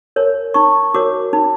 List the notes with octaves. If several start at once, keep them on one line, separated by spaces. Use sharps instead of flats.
A#4 C#5
D#4 C#6
F#4 A#4 C#5 D6
D#4